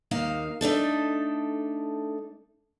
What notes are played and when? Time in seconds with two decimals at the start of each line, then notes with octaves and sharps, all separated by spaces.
0.11 D#2 A#3 D#4 F5
0.61 A3 D4 D#4 A4